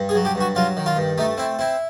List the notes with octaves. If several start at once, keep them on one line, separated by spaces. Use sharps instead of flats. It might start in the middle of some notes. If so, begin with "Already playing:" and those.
Already playing: G2
G#4
F#3
G4
G2
F#4
F#3 F4
D#3
F4
G2
A3 D#4
C4 E4
C4 E4